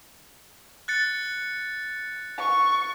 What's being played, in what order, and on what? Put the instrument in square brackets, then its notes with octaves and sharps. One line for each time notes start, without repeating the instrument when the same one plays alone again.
[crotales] F#6 A6 C#7
[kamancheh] C#6